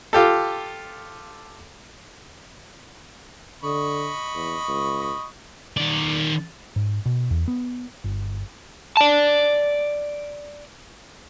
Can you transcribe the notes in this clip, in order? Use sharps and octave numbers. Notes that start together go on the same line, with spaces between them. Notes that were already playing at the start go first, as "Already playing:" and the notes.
F4 G4 A4
D3 D#5 B5 C#6
E2
C#2
D#3 D5
G#2
B2
E2
B3
G1
D5 A5